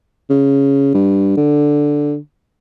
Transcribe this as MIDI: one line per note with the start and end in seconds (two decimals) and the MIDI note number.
0.30 0.94 49
0.94 1.32 43
1.37 2.16 50